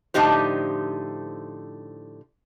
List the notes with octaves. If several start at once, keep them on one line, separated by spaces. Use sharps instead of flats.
A2 D3 F3 D#4 G4 C5